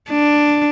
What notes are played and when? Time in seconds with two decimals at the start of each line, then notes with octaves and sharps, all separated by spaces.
0.10 D4